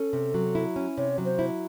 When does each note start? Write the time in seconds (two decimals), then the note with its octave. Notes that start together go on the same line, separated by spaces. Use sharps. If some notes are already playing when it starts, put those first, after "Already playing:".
Already playing: C#4 A4
0.13 C3
0.34 F#3
0.55 E4
0.76 C#4
0.97 C3 C#5
1.18 F#3
1.25 C5
1.39 E4